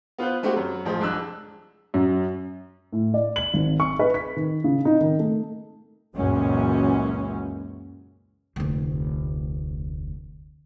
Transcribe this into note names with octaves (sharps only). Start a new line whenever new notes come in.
B3 F4 B4 C5 F#6
G#3 A3 C4 F#4 G4
F#2
A1 F3 G#4 C5
C2 F2 G#3 D4 E6 F#6
F#2
A2
D5
F#7
G#1
C#6
B4
B6
D#3
C#3
D#4
D#3
A3
C#2 F#2 A#2 E3 G#3 C#4
F1 D2